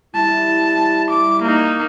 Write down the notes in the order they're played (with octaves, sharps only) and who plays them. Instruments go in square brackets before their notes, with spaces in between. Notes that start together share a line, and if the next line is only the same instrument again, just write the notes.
[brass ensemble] G3 E4 [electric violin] A5
[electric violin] D6
A#3 D#4